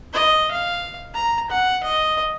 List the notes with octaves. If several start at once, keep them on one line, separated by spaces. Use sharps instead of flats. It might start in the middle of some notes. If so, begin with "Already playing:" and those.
D#5
F5
A#5
F#5
D#5